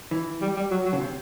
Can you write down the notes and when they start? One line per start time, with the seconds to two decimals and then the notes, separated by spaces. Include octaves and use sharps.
0.11 E3
0.41 G3
0.56 G3
0.71 F#3
0.86 F#3
0.93 C#3
1.01 C3